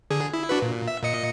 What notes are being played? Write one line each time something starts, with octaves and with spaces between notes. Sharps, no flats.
D3 G#4
E4
D4 F#4 B4
A#2
E5
A#2 D#5 C#7